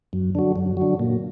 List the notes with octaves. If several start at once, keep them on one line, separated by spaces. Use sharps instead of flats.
F#2
D3 F#3
F#2
D3 F#3
A#2